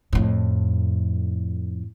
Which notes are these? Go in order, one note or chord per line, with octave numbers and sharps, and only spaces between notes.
F2 A2